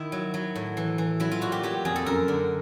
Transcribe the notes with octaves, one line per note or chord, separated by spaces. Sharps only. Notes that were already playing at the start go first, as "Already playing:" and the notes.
Already playing: D#3 E4
F#3
F#3
A2
E3
E3
F#3 E4
F4
A#2 F#4
G4
F#3 G4
F2 G#4
A4
F#2 A#4
D3